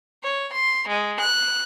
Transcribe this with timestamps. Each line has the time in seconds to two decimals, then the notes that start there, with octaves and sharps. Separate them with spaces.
0.23 C#5
0.52 C6
0.88 G#3
1.20 F#6